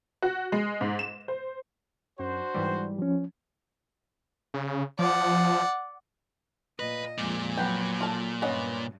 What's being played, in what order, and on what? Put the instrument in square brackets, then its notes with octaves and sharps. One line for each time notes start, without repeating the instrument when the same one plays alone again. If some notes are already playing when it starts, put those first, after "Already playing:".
[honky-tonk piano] F#4
G#3
G#2
E7
C5
[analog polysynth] F#2 [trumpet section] D4 F#4 C5
[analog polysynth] G#2 E3 G3
[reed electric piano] F3 C#4
[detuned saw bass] C#3
[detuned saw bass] F3 [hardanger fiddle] D5 F#5
[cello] A#2 D#5 [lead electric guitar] B4
[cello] F2 G#3 [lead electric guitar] A#2
[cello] F#3 [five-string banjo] B3 G5
[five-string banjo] F4 A4 A5
[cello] G2 [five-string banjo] B3 C#4 D#5